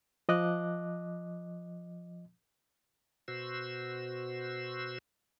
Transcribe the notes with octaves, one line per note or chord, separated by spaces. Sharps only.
F3 D#5 D6 F#6
B2 F#4 C5 E6